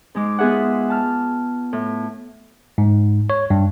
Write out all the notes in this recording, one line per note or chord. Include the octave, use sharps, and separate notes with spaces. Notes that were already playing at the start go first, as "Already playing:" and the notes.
G#2 G#3 D6
B3 F4 G#4 E5 F#5
A5 F6
A2
G#2
C#5
G2